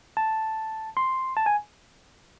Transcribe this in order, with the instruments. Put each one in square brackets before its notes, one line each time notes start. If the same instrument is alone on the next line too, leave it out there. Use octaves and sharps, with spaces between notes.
[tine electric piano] A5
C6
A5
G#5